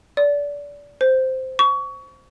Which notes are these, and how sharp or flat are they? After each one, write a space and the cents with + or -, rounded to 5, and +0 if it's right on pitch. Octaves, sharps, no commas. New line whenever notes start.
D5 -25
C5 -5
C#6 +25